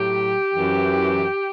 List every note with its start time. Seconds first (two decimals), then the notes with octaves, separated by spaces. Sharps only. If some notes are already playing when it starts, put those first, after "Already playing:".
Already playing: A2 F#3 G4
0.53 F#2 E3